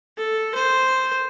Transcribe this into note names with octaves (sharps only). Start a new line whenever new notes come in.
A4
C5